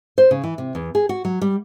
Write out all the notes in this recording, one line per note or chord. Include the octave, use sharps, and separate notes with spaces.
C5
C#3
E3
C3
E2
G#4
F#4
F#3
G3